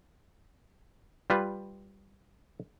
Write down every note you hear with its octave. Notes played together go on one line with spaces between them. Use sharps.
G3 F4 B4